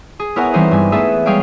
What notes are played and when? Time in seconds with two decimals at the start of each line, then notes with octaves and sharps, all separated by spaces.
0.20 G#4
0.36 B3 E4 A#4 C#5 F#5 G#5
0.54 E3 G3 C4 D#4 C5 C#5
0.71 G2 G3 G#5
0.92 A3 B3 G#4 A4 B4 E5
1.26 G3 G#3 G#4 C#5 F5 G5